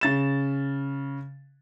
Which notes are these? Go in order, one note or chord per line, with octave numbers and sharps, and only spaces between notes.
C#3 A6 E7